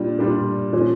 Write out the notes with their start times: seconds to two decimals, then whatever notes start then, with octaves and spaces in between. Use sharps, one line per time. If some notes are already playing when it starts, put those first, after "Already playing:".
Already playing: A#2 G3 D4 F4
0.19 A#2 G3 D4 F4
0.73 A#2 F3 C#4